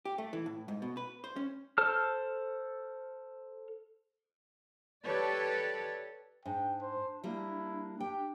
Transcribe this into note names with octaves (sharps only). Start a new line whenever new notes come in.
G4
A3
E3
A2
G#2
B2
B4
C5
C#4
A4 C5 A5 F6
G4 A4 B4 C#5 D5
G#2 D4 G5
C5
G3 A#3 E4
G4 G5